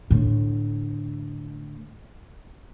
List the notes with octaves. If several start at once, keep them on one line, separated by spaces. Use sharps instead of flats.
A2 D3